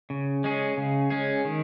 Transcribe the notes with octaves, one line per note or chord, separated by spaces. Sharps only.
C#3
G#3 C#4 G#4
C#3
G#3 C#4 G#4
D#3